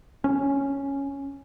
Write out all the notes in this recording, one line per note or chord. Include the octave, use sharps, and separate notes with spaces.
C#4